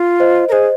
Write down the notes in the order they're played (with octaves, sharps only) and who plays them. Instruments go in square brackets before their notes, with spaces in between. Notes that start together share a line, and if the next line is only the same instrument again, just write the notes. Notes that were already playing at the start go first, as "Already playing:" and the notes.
Already playing: [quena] F4
[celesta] C5 D#5
[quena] A#4
[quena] G#4 [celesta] C5 D#5